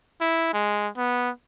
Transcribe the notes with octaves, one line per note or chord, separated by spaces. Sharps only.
E4
G#3
B3